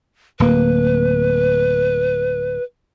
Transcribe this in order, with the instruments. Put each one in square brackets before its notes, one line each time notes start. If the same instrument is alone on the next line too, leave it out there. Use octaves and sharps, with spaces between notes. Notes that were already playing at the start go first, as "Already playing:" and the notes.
[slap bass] D1 A#3 [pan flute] B4